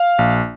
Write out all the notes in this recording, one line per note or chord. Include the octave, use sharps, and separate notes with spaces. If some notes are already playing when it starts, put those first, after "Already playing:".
Already playing: F5
A#1